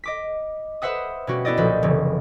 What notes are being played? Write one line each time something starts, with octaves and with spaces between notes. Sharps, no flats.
D#5 D6 B6
B4 C5 E5 F#5 D#6
B2 G3 C#4 F#4 G4
B3 E4 D5 D#5
B1 A#2 F3 B4 G6
F1 C#3 E3